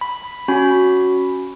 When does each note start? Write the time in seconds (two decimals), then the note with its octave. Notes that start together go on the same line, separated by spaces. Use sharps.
0.01 B5
0.48 C#4 F#4 B5